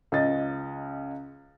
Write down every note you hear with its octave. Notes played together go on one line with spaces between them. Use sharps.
C#2 D#5 A6